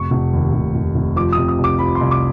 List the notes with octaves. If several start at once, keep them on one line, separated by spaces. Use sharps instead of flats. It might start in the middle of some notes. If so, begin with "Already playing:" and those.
Already playing: F1 C#6
F1
D#2
F1
F1
F1
F3 D6
D#6
C3
D#6
C2
D6
F3 B5
C6
C2
D6